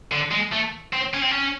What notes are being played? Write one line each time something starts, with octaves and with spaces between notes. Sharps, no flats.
D3
G#3
A3
C4
C#4
C4
C#4